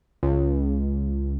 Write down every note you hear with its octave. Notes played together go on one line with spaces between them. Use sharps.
C#2